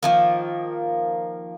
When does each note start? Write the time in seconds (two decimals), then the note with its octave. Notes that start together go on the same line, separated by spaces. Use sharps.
0.03 D#3 F3 A#3